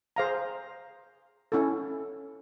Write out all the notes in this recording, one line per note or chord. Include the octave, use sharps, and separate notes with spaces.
G#4 C5 F5 A#5
C#4 E4 A4